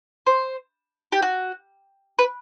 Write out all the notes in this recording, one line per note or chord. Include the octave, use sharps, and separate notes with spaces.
C5
G4
F#4
B4